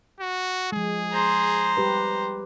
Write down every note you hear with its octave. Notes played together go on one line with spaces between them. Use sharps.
F#4
F3 G#3 G#4
C5 A#5
G3 G4 B4